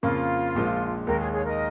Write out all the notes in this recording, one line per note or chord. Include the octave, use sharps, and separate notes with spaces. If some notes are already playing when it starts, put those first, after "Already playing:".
F2 C#3 A#3 F4
A#1 A#2 F3 G#3
D#2 D#3 G#3 A#4
G#4 C#5
G#4 C#5
A#4 D#5